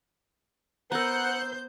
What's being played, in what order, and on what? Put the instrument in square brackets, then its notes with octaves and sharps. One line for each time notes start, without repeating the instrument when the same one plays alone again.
[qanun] B3 A#4 [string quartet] C5 G6 [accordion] F#5 F#6 [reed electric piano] A#5 E6